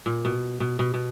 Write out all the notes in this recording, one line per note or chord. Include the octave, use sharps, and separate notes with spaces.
A#2
B2
B2
B2
B2